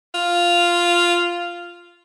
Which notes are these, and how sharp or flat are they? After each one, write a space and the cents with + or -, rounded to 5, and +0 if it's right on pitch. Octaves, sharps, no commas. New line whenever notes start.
F4 -5